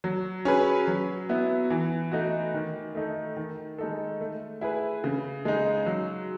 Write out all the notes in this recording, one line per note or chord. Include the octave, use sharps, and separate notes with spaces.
F#3
C#4 G#4 B4
F#3
B3 E4
E3
A3 D#4 F#4
D#3
A3 D#4 A4
D#3
G#3 D#4 A4
A3
E4 G#4 B4
C#3
G#3 D#4
F#3